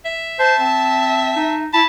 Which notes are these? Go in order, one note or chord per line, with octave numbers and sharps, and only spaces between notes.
E5
C5 A5
C4
D#4
E4 A5 B5